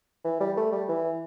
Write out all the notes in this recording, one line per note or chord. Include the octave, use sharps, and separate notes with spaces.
E3
G3
A3
G3
E3